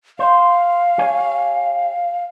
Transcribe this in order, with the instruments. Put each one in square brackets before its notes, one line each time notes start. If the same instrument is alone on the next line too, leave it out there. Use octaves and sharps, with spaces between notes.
[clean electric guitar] C5 [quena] F5
[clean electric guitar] G4 C#5 G#5